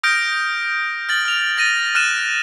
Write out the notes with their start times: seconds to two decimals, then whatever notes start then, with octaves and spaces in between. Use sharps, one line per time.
0.03 D#6 F6 G6 A#6 D7
1.09 F6 A6 F#7
1.25 F6 F7
1.57 A6 A#6 D#7
1.95 F6 F#6 A6 D#7 E7